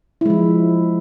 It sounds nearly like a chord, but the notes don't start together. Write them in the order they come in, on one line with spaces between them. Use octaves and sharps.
E4 G#3 F3